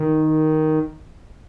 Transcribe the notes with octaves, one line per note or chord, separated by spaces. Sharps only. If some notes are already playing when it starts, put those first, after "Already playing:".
Already playing: D#3